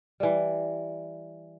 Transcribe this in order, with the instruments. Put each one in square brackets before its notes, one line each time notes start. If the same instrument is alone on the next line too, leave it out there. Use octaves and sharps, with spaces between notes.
[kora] E3 G3